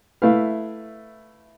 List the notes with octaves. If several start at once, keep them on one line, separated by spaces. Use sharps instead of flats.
A3 E4 B4 F5